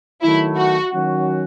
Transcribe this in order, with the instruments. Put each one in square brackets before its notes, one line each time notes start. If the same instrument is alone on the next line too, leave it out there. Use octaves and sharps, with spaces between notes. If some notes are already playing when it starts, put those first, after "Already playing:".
[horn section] D#3 F#3 A3 [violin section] E4
[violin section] F#4
[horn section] D#3 F#3 C#4 F#4